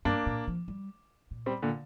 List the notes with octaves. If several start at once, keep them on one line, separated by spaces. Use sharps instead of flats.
G2 A#3 D4
A#2
F3
G3
A#2
G3 C4
A#2 D3